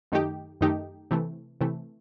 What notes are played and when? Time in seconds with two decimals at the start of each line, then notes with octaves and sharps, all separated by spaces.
0.12 F#2 D#3 A3 D#4 G4
0.61 F#2 D#3 A3 D#4 G4
1.11 C3 E3 A3
1.61 C3 E3 A3